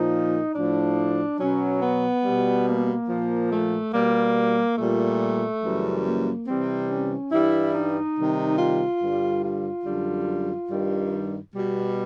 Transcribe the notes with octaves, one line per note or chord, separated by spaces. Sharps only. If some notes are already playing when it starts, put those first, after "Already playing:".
Already playing: A#2 F3 D#4
A2 F3 D4
B2 F#3 C#4
B3
G3
B2
A#3
A#2 F3
A3
B2 G3 A#3
A#2 G3 A3
F#2 C#3 E3 G3
A#3
C3 E3 G3 C4
C#4
G2 E3 G3 E4
D#4
C3 D#3 G3
F4
G2 D3 G3
F4
F#2 D3 G3
G2 D#3 G3
B2 G3